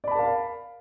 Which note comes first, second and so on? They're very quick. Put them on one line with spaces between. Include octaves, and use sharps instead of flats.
D5 B5 A5 A#4 F5